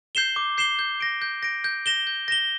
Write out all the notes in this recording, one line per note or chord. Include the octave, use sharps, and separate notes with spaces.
G6 C7 E7 G7
D6
G6 C7 E7 G7
G6
A#6 D7
G6
A#6 D7
G6
A#6 E7 G7
G6
A#6 E7 G7